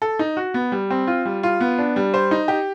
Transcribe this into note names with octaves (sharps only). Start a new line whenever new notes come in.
A4
D#4
F#4
B3
G3
C4
F4
G3
F4
B3
D4
G3
C5
D#4
G4